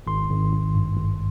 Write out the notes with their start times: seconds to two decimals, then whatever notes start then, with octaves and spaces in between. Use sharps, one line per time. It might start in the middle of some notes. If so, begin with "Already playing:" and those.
0.07 G#1 C6
0.30 G#1
0.53 G#1
0.75 G2
0.97 G#1